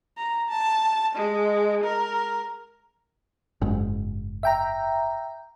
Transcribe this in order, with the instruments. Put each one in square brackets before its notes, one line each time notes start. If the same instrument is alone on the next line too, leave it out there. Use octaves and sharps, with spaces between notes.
[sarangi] A#5
A5
G#3
A#4
[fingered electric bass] F#1 G#2
[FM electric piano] E5 G5 A#5